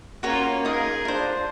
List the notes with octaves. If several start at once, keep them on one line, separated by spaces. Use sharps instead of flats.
A#3 C#4 F4 F#4 C#5 A#5
D#4 G#4 A#4 D#6
D4 F4 C5